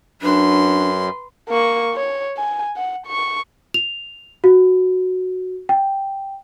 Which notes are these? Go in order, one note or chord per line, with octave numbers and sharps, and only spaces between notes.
F#2 D4 B4 C6
A#3 C#6
C#5
G#5
F#5
C#6
F7
F#4
G5